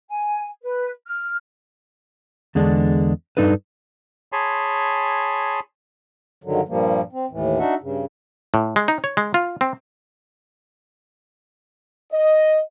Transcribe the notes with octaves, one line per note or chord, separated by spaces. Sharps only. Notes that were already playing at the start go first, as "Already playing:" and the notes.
G#5
B4
F6
E2 D3 G#3 D4
G2 F3 D4 D#4 A4 B4
G#4 C#5 G#5 A5 B5 C6
G2 D3 D#3 F#3
G2 A#2 F3 G3 A#3
C4
D#2 A2 E3
D4 D#4 F#4 E5 F#5
G2 C#3
A2
G#3
D#4
C#5
G#3
F4
C4
D#5